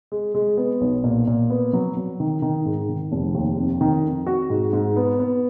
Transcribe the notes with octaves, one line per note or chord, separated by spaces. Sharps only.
G#3
G#3
B3
B1
A#2
A#2
B3
F#3
F#3
D#3
D#3
G#2
D#3
F1
D#2
F2
D#3
F2
F#4
G#2
G#2
B3
B3